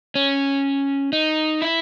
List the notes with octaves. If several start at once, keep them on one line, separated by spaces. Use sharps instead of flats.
C#4
D#4
E4